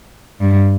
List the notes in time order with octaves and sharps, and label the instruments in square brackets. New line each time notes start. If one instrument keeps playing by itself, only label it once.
[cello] G2